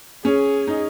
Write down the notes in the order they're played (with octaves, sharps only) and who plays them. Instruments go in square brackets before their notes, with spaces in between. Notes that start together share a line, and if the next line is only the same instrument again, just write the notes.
[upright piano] C#4 [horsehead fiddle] G#4
[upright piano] D#4